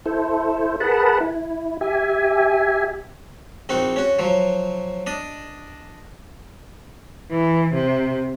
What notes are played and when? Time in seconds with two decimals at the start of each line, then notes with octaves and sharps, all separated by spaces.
0.06 E4 A4 C5
0.80 G#4 A#4 B4 F#5 A5 B5
1.20 E4
1.81 G4 E5 G#5
3.69 A#1 C4 D#4 F#4
3.96 C#4 F#4
4.19 F3 F#3
5.07 D4 D#5
7.31 E3
7.74 C3